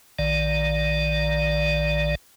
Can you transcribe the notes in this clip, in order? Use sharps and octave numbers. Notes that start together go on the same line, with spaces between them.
A#1 D#3 D5